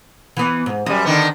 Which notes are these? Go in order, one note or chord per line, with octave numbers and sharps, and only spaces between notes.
E3 B3
G#2
F#2 G3 D#5
D3 D#3 B3